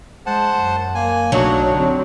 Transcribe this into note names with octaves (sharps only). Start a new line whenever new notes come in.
G#3 C5 F#5 A5
F#2
A#3 G#5
B1 F#3 A3 D4 D#4
D3 C4